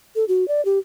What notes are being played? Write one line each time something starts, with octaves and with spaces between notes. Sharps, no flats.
A4
F#4
D5
G4